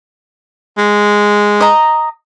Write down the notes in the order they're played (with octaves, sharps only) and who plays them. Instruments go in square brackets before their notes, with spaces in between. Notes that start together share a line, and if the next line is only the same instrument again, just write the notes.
[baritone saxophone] G#3
[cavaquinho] D#5 A#5